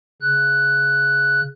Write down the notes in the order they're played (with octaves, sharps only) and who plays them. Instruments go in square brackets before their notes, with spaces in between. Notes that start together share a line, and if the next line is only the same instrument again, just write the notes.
[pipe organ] C#3 F#6